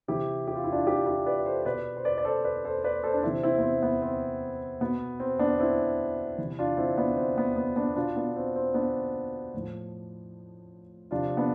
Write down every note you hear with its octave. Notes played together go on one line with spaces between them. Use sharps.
C3 E3 E4 G4
G4
F4
E4
D4 F4
E4 G4
E4 G4
B4 D5
A4 C5
B2 B4 D5
C5
B4 D5
D5
A4 C5
B4 D5
A4 C5
B4 D5
A4 C5
D4
C3 E3 C4 E4
C4 E4
B3
C4
B3
C4
B2 B3
C4
B3 D4
C4 E4
C3 E3
D4 F4
C4 E4
B3 D4
C4
B3
B3
B3 D4
B2 D4 F4
B3 D4
C4
C4
B3 D4
A2 F3
C3 F3 D4 F4
B3 D4